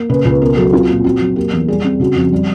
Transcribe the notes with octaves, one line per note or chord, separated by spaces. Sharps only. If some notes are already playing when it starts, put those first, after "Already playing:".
Already playing: A#3
C#3 B4
C#2 B4
B2 A#4
F#3 A4
C4 F4
A#2
C4 F#4
F#3
A#3 G4
E2
G3 G#4
C4
C#3 F#4
F2
G3